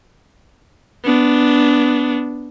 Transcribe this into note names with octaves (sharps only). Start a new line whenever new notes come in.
B3 D4